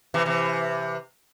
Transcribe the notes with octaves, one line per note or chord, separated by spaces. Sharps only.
C3 E3
C3 E3